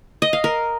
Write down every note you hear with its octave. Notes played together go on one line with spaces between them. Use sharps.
D#5
F5
A#4